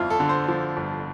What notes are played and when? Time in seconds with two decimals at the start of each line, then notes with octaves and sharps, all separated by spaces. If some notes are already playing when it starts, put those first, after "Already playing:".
Already playing: G1 F2 E4 F4
0.10 A4
0.20 D3
0.29 C5
0.48 F3
0.77 G1